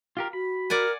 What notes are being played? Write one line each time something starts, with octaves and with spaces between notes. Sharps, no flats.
F4 G4 A#4
F#4 B5
A#4 D5 F#5 G#5